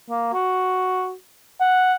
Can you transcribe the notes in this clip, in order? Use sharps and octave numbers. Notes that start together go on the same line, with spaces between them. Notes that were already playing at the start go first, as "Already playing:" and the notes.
A#3
F#4
F#5